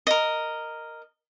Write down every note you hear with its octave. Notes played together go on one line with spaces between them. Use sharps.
A#4 D#5